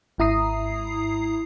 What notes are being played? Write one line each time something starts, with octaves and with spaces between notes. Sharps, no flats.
G#1 G#2 E4 A#5 D#6 C7